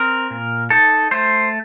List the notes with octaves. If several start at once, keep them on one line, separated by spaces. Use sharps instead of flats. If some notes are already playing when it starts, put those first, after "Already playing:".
Already playing: C4 A#4
A#2
D#4 A4
A3 C5